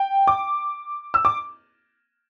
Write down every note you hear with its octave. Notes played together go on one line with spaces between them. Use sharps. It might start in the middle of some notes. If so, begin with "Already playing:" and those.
Already playing: G5
D6
E6
D6